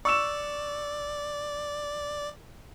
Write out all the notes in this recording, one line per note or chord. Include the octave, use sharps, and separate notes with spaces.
D5 C#6 E6 E7